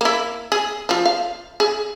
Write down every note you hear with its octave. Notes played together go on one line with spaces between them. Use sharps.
A#3 E4
G#4
F3 F4
F5
G#4